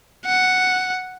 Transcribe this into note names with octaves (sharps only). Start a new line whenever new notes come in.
F#5